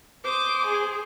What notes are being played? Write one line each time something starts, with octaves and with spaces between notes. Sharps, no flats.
C5 D6 D#6
G#4